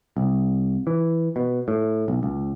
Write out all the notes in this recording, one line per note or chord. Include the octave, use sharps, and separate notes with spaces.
C2
E3
B2
A2
B1
C#2